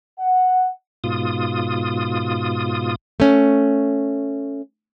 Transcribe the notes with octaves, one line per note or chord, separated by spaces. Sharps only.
F#5
G#2 B2 F4 D#6
A3 C#4